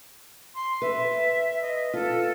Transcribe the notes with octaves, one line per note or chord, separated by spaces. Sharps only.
C6
B4 E5
D#5
F4 A4